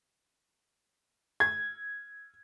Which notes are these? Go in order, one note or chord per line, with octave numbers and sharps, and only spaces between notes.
G#6